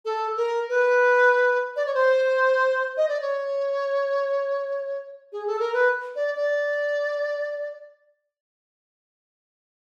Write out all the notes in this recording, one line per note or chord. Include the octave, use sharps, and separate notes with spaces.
A4
A#4
B4
D5
C#5
C5
D#5
D5
C#5
G#4
A4
A#4
B4
D5
D5